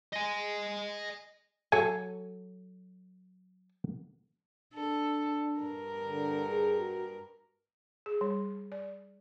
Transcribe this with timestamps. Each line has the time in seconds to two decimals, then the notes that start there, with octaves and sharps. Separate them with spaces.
0.13 D#5 G#5
1.72 F#3 A4 G#5
4.74 D4 A4
5.60 G2 A#4
6.04 D3
6.49 G#4
6.78 F#4
8.06 G#4
8.21 G3
8.72 D5